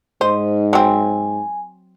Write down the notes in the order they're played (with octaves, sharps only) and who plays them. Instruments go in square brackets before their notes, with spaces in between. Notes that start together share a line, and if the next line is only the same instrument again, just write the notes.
[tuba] G#2 [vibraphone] D#4 D#5 [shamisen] C5
[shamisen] F#3 C4 [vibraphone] G#5